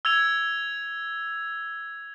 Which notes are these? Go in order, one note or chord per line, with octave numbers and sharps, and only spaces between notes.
E6 G#6 F7